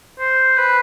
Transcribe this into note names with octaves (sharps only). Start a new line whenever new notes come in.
C5
B4